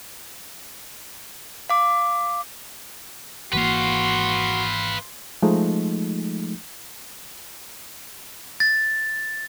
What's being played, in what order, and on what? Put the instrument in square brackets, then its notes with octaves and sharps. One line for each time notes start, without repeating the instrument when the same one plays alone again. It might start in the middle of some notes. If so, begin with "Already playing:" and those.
[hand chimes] F5 D6
[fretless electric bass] G#1 E3 A#3 [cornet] F#4 [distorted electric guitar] B4 F5 [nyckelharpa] C6
[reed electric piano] F3 G#3 A3 D#4
[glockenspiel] A6